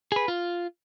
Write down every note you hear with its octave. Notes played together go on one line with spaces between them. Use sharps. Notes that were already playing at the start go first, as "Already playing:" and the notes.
G#4 B4
F4